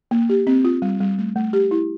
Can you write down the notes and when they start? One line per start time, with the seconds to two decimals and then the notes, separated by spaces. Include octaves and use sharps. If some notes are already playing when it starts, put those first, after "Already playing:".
0.11 A#3
0.29 G4
0.47 C4
0.65 F4
0.82 G3
1.00 G3
1.18 A3
1.36 A3
1.53 G4
1.71 E4